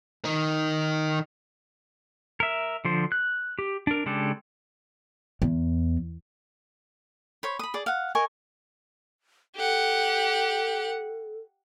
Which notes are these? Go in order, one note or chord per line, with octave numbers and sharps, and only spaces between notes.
D#3 D#4
A#4 E5
D3 F3 C5
F#6
G4
D4 A#4
C#3 G#3 D4 G4 A4
E2
C5 C#5 B5
B5 D#6
G#4 D5
F5 F#5
A#4 D#5 G#5 C#6
G4 A4 F#5